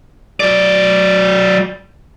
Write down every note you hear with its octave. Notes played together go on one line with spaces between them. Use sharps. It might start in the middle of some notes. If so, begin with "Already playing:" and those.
F#3 D5